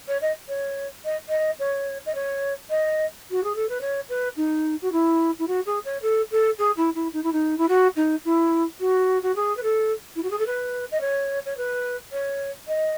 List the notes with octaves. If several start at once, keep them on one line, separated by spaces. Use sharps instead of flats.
C#5
D#5
C#5
D#5
D#5
C#5
D#5
C#5
D#5
F#4
G#4
A4
B4
C#5
B4
D#4
F#4
E4
E4
F#4
G#4
C#5
A4
A4
G#4
E4
E4
D#4
E4
D#4
E4
F#4
D#4
E4
F#4
F#4
G#4
B4
A4
E4
F#4
G#4
A4
B4
D#5
C#5
C#5
B4
C#5
D#5